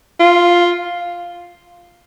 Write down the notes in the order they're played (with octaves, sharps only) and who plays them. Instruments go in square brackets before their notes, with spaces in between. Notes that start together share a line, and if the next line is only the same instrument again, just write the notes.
[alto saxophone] F4